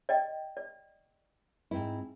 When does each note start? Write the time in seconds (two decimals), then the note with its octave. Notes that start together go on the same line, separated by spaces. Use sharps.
0.09 D5 D#5 G5
0.57 D5
1.71 G#2 C4 E4